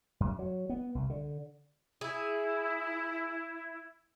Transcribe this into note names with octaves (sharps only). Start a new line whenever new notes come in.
F#2
F#3
B3
C2
D3
E4 G#4